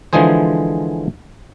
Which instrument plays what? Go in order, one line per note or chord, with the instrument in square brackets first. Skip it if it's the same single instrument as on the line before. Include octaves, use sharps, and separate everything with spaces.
[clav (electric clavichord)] D3 E3 F3 G#3 G#4 C5